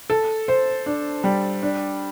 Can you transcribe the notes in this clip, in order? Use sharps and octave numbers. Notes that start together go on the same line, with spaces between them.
A4
C5
D4
G3
D4